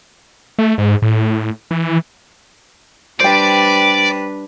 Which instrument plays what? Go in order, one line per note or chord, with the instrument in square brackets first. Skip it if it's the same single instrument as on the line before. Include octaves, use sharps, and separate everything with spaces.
[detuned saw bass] A3
G#2
A2
E3
[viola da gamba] G3 D4 B4 [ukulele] C5 G5 [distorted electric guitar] D5